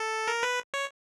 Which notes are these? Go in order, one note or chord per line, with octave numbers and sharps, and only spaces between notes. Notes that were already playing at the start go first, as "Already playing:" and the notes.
Already playing: A4
A#4
B4
C#5